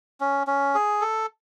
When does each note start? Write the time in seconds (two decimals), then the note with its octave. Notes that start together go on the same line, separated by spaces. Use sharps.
0.20 C#4
0.47 C#4
0.75 G#4
1.01 A4